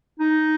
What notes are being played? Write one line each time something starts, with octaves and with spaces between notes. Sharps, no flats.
D#4